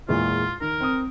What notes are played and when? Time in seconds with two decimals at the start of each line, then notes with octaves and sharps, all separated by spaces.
0.09 E2 A#2 G#3 F4
0.61 D#3 A#4
0.81 C4 D#6